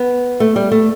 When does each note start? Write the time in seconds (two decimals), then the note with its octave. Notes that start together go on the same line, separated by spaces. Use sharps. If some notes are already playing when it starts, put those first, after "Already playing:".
Already playing: B3
0.40 A3
0.56 G3
0.72 A3